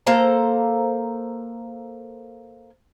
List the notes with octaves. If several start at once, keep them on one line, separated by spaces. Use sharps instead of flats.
A#3 A4 C5 A#5